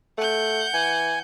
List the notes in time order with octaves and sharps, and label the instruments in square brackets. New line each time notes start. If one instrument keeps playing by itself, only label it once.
[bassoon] A3 [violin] F#5 G6
[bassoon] E3 [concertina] G#5